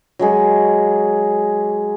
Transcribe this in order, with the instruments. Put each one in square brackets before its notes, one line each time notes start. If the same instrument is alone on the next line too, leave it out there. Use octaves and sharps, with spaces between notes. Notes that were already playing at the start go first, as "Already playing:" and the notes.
[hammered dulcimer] F#3 G#3 G#4